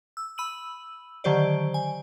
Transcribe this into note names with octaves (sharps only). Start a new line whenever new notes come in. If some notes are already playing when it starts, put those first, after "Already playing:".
E6
B5 E6 D#7 F#7
D3 D#3 F#3 G4 C5 D5
G#5